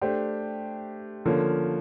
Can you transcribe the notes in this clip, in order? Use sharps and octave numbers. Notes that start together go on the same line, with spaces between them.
A3 D4 G4 C5
D3 F3 A#3 C#4